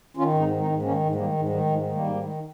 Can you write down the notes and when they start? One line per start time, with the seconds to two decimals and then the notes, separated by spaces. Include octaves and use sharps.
0.17 D#3 C#4 F4
0.33 G#2 C4 D#4
0.49 D#3
0.60 C4 D#4
0.67 G#2
0.82 D#3 A#3 C#4
1.00 G#2
1.15 D#3 G3 A#3
1.32 G#2
1.49 D#3 G3
1.65 G#2
1.70 F3 G#3
1.81 D#3
1.92 G3 A#3
1.98 G#2
2.14 D#3